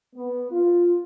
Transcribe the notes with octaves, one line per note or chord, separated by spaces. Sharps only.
B3
F4